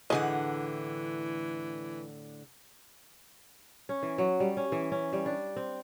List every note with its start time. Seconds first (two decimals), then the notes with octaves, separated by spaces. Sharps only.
0.10 A2 D3 E3 G#4 D#5 F#5
3.89 C#4
4.03 E3
4.18 F#3
4.40 G3
4.57 C#4
4.72 E3
4.92 C#4
5.13 G3
5.26 D4
5.56 C4